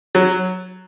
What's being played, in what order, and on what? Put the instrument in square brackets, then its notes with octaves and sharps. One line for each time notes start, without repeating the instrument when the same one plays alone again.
[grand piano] F#3